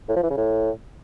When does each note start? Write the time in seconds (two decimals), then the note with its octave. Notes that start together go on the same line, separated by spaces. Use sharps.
0.09 A2
0.16 F3
0.23 E3
0.30 C#3
0.37 A2